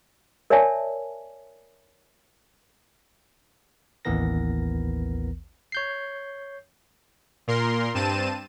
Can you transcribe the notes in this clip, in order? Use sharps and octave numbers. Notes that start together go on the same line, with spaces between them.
A#4 C#5 D5 E5 G#5 A5
A1 D#2 E3 B3 A#4 A#6
C#5 G6 C7
A#2 A#4 C6
G2 C4 A5 D#7 E7